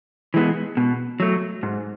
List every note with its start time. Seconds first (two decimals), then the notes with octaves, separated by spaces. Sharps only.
0.34 E3 G#3 B3
0.77 B2
1.20 F#3 A3
1.63 G#2